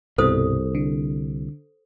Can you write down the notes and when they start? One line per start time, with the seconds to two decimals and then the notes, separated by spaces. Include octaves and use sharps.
0.18 C2 G2 B2 A4 C5 D#6
0.75 D3